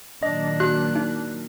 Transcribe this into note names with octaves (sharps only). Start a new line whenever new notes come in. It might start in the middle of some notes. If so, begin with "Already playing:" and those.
A#2 D#3 F#3 D4 D#5
F#4 F#6
D#4